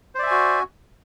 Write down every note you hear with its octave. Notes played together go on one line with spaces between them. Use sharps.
F#4 C5 D5 E5 G#5